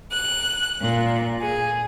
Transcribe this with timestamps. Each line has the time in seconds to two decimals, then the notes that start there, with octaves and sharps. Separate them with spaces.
0.11 F#6
0.81 A#2
1.41 G#4